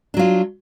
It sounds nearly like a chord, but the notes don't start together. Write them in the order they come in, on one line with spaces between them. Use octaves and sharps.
D4 F#3 F4